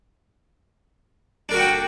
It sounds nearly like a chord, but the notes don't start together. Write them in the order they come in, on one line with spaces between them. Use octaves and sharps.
D4 A#4 F#4 F#5 G5